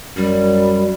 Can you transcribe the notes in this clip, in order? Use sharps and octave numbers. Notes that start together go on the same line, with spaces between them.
F#2 G3